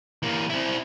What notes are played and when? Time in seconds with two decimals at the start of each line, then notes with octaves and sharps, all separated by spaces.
0.23 E3 A#3
0.50 C4 E4